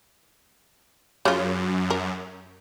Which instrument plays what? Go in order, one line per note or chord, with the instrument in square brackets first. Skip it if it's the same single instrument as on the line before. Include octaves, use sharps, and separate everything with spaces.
[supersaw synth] F#2 [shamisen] C#3 F4
[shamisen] A#4